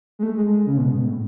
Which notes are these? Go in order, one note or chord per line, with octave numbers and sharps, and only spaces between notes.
G#3
A3
G#3
G#3
C#3
B2
G#2
A2